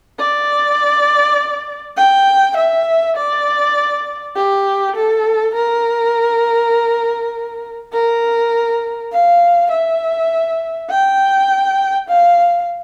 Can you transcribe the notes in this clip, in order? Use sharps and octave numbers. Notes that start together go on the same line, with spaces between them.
D5
G5
E5
D5
G4
A4
A#4
A#4
F5
E5
G5
F5